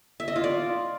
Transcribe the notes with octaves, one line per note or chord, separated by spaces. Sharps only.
E5
D#5
F4
D5